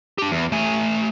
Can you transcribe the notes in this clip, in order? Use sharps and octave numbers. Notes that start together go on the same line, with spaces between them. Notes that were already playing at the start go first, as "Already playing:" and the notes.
D4 G4
E2
A3 G#5